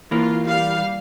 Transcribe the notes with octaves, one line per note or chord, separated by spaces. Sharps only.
E3 A#3 F4
G3 F5